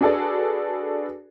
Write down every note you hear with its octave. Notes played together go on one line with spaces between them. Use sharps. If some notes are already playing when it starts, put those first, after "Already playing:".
D4 F#4 G#4 A4 B4 D5